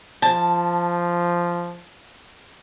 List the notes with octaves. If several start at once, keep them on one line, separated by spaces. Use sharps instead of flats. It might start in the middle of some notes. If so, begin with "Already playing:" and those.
F3 A5